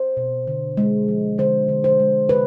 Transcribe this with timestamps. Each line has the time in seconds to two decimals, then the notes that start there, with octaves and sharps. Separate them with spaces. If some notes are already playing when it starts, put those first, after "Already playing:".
Already playing: C5
0.17 B2
0.47 D3
0.77 G#3
1.08 F3
1.38 D3 C5
1.69 D3
1.84 C5
2.00 G#3
2.29 C3 B4